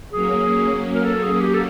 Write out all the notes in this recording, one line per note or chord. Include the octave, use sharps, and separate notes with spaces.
F#3 A#3 C#4 G#4
A#4
A4
G#4
G4
A4